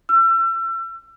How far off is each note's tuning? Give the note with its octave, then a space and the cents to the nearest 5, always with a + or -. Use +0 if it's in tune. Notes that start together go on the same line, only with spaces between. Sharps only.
E6 +35